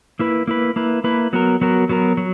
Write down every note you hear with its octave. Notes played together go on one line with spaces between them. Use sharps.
A#3 E4 B4
A#3 E4 B4
A#3 E4 B4
A#3 E4 B4
F#3 B3 F#4 A#4
F#3 B3 F#4 A#4
F#3 B3 F#4 A#4
F#3